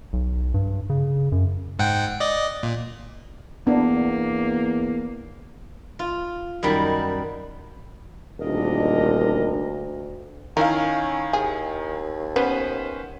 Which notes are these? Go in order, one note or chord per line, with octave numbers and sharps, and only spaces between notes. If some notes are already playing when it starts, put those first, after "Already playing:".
B1
G2
C#3
F#2
G#2 F#5 G5
D5 D#5
A#2
E2 A#3 B3 D4
F4
F#2 D#3 G3 B5
D#1 D2 D4 A#4 D#5
D#3 C#4 E4 A#4 F5
D#2 G#4
B3 C#4 B4 C5